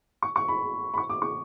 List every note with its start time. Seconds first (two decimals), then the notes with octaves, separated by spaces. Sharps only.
0.22 C#6
0.36 C#6
0.48 B5
0.94 B5
0.98 C#6
1.09 D6
1.22 C#6